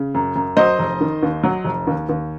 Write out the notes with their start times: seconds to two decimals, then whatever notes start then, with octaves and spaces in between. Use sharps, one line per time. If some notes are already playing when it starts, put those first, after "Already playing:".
Already playing: C#3
0.14 F#2
0.35 F#2
0.57 F#3 C5 D#5
0.79 F1
1.01 D#3
1.23 D#2
1.44 F#3
1.65 F1
1.87 D#2
2.09 D#2